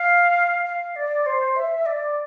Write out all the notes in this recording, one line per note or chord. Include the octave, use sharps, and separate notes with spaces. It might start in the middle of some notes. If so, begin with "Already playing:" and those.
Already playing: F5
F5
D5
C5
E5
D5